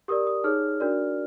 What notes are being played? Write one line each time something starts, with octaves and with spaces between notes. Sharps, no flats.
G4 A#4 D5 D#6
D#6
D#4 G#4 C#5 F6
D4 F#4 A#4 D5